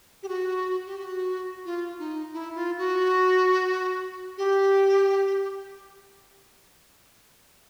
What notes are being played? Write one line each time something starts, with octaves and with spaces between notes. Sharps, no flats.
G4
F#4
G4
F#4
F4
D#4
E4
F4
F#4
G4